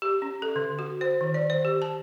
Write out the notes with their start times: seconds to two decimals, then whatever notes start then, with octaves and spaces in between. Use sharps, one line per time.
0.02 G4
0.22 C#4
0.42 A4
0.56 D3
0.79 F#4
1.01 C5
1.21 D#3
1.34 D5
1.50 C5
1.65 G4
1.82 A5